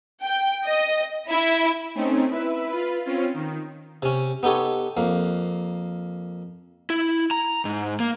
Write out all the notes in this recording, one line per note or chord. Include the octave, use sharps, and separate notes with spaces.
G5
D#5
E4
A3 C4 C#4 D#4
E4 B4 E5
F4 B4
C4 C#4 F4
D#3
C3 C#4
B3 D#4 G4 A4 C#5
F2 A#3
E4
A#5
G#2
A#3